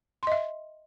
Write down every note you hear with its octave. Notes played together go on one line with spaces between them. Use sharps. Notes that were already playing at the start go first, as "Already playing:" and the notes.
D#5 E5 C6